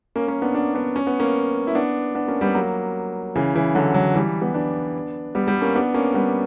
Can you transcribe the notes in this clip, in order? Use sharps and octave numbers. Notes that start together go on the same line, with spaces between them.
A#3 C#4
A#3 C#4
B3 D4
B3 D4
B3 D4
C#4
B3
A#3 C#4
E4
B3 D4
B3 D4
A#3 C#4
G3 B3
F#3 A#3
C#3 E3
C#3 E3
D3 F#3
D3 F#3
E3 G3
G3 B3
B3 D4
G3 B3
G3 B3
A#3 C#4
B3 D4
A#3 C#4
G3 B3